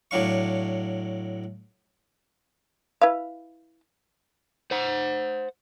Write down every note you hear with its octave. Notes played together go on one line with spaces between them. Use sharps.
A2 F#3 D4 F5 C#6
E4 B4 F5
C5 F#5